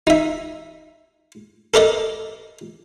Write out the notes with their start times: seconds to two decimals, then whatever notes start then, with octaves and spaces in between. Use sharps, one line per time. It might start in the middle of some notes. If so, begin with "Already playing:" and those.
0.07 D#4 E5
1.74 A4 A#4 D5 D#5